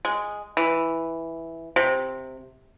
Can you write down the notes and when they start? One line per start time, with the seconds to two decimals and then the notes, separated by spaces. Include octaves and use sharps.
0.05 G#3
0.57 E3
1.76 C3